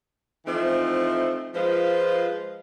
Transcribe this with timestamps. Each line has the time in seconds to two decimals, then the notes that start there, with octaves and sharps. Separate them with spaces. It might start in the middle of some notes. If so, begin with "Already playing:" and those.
0.45 E3 F3 A3 C4 D#4
1.54 F3 G#3 F4 B4 C5